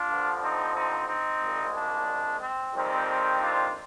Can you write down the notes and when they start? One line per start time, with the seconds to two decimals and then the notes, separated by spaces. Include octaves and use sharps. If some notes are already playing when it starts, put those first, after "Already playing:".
Already playing: D4 F4
0.10 G2 D3 F3
0.42 C4 D#4
0.75 C4 D#4
1.08 C4 D#4
1.42 C2 A#2 G#3
1.74 D4
2.41 C4
2.75 F2 D#3 G3 C4
3.41 D4 F4